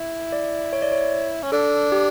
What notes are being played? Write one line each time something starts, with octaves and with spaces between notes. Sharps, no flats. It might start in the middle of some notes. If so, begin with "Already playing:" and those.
Already playing: E4
D5
C#5
D5
C#5
C#4
D4 A4
G4